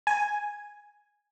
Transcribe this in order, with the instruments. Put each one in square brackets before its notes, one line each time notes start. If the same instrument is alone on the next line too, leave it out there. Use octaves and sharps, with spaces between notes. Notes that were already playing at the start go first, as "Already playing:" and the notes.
[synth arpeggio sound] G#5